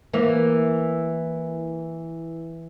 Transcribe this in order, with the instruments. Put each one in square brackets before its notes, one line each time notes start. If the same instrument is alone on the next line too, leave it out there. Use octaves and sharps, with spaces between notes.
[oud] E3 A#3